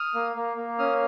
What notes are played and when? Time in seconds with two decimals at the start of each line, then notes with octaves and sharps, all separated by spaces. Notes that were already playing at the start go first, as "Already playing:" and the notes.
Already playing: D#6 F6
0.15 A#3
0.36 A#3
0.57 A#3
0.79 C#4 D#6 F6